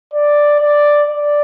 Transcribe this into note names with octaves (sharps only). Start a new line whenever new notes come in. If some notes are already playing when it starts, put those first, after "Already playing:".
D5
D5
D5